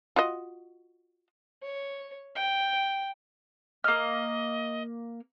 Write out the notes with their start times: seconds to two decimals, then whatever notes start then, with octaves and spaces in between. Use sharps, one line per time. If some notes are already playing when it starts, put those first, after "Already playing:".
0.16 F4 F#4 D#5
1.63 C#5
2.36 G5
3.84 A#3 D#5 F6